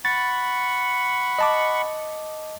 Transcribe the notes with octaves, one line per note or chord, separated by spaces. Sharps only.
F#5 B5 C#6 A6
D#5 A5 D6